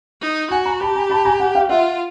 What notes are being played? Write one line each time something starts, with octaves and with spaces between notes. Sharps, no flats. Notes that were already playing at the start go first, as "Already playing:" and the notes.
D#4
F#4 F#5 G#5
G#5 A#5
G4 A5 B5
G#5 A#5
A5 B5
G#5 A#5
F#5 G#5
F5 G5
F4 E5 F#5